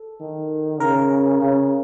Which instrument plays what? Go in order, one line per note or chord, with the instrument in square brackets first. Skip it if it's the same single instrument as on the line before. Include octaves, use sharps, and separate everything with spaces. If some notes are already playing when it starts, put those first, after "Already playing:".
Already playing: [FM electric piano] A4
[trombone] D#3
[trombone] C#3 [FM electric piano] A#4
[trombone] C#3